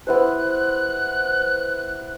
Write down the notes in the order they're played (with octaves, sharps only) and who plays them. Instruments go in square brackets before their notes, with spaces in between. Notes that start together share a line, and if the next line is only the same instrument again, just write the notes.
[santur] B3 E4 C5 [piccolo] F#6